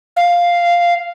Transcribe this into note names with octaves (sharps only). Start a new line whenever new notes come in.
F5